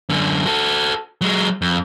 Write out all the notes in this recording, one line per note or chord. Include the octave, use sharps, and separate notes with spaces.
F#2 D3
F#4 A4
F#3 G#3
F2